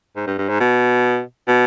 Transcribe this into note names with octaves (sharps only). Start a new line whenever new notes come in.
G#2
G2
G2
G#2
B2
B2